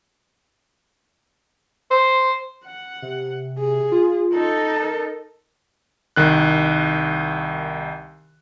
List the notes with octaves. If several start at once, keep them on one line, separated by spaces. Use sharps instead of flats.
C5
F#5
C3
G#4
F4
D#4 A4
A#4
C2 D#3 F#6